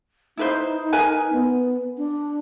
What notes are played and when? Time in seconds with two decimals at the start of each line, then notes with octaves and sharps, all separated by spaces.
0.38 D#4 E4 B4 C5
0.93 A#4 B4 G#5
1.33 B3
1.98 D4